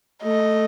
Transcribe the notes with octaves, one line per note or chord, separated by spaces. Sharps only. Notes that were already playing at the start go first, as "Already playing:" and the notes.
A3 D#5